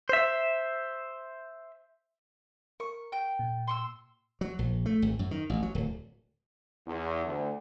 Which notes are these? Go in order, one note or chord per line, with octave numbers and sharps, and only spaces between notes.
C5 E5
A#4 C#6
G5
A#2
C6 C#6 E6
F#3
A#1
A3
G#1
F#2
D#3
A1
F#3
D1
E2
D2